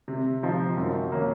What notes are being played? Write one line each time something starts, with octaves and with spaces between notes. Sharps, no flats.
C3
F3 C4 D#4
F#2
D#3 A#3 C#4